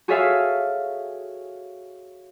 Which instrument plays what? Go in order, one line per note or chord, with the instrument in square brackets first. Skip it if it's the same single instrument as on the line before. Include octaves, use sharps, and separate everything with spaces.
[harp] F#4 G#4 A4 C#5 E5 F5